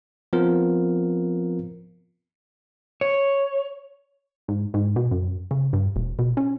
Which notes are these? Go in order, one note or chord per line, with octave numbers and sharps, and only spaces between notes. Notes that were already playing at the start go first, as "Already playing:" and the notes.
F3 B3 C4 F4 A#4
C#5
G#2
G#2
B2
F#2
C#3
G2
E1
B2
C#4